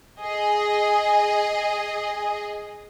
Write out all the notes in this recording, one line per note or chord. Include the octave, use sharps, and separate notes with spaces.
G#4 D#5